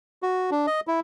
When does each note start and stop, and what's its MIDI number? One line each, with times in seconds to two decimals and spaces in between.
0.23 0.50 66
0.51 0.66 62
0.67 0.80 75
0.87 1.00 64